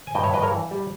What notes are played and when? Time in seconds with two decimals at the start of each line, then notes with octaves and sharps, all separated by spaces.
0.07 G#5
0.15 G2 D#5 G5
0.24 C#5 E5
0.34 G2 B4 D#5
0.43 A#4 C#5
0.52 E3
0.71 G3